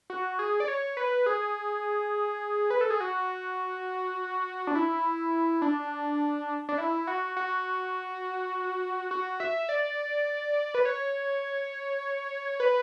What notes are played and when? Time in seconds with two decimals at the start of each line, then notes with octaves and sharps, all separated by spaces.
0.10 F#4
0.39 G#4
0.60 D5
0.68 C#5
0.97 B4
1.26 G#4
2.70 B4
2.81 A4
2.90 G#4
3.00 F#4
4.67 D4
4.75 E4
5.62 D4
6.69 D4
6.78 E4
7.07 F#4
7.36 F#4
9.11 F#4
9.40 E5
9.69 D5
10.74 B4
10.85 C#5
12.60 B4